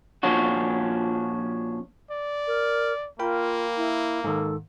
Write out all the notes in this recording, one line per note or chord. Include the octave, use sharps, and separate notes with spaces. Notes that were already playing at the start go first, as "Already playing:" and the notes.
A#2 F3 C#4 D4 F#4
D5
A#4
A#3 F4 A#4 G5 B5
E4
G#2 D#3 A4